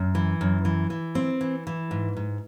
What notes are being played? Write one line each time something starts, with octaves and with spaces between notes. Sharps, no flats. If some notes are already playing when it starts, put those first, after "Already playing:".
Already playing: F#2
E3
F#2
E3
E3
C4
E3
E3
G#2
G#2